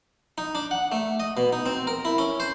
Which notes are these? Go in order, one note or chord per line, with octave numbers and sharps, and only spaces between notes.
D#4
D4
F#5
A3
D#5
B2
D#4
C4
A#4
E4
C#4
C5